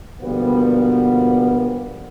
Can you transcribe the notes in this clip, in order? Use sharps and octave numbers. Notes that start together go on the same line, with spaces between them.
B2 D3 F3 G3 A#3 B3